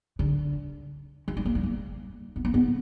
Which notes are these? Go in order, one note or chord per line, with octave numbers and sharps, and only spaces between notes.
D3
E3
G3
A#3
G3
A#3
B3
A#3
B3